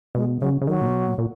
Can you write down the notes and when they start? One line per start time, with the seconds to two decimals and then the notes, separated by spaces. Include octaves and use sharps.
0.15 B2 G#3
0.41 C#3 F#3
0.62 C#3
0.67 D#3 F#3
0.81 A#2
0.87 B2
1.07 A#2
1.18 A#2